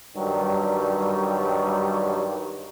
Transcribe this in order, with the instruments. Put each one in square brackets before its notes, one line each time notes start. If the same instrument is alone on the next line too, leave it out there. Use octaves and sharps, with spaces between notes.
[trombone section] G2 D#3 F#3 G3